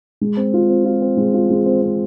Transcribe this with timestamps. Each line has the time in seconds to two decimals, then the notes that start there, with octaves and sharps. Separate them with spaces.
0.21 G#3
0.37 C4
0.54 F4
0.69 C4
0.85 F4
1.02 C4
1.17 G#3
1.34 F4
1.50 G#3
1.66 C4
1.82 C4